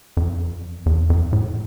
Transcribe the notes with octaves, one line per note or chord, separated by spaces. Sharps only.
F2
E2
F2
A2